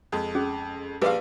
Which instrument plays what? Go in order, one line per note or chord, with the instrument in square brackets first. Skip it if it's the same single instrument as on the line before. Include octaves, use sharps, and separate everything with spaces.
[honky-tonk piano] F2 G#3
[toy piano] C#4 G#4
[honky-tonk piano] A#1 D5 F5 [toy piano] G4 G#4 B4